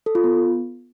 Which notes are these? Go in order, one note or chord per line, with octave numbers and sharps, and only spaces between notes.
A4
F4
B3